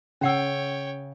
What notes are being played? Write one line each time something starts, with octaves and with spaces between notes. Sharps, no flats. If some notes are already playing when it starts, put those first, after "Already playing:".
C#3 C#4 C#5 F#5 G5 E6